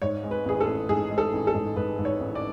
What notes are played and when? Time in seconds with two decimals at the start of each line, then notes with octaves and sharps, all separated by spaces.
0.02 G#2 C#5
0.24 G#3
0.31 B4
0.46 A1 G#4
0.60 A4
0.67 A1
0.89 G#2 G#4
1.11 G#3
1.18 A4
1.33 A1
1.47 A4
1.55 G#2
1.76 G#2 B4
1.99 G#2
2.05 C#5
2.20 A1
2.35 D5